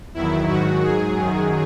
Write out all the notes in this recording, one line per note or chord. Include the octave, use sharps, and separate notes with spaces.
E2 D#3 F#3 E4
G#2 D#3 F#3 F#4
G#2 F#3 G#4
F#2 D#3 F#3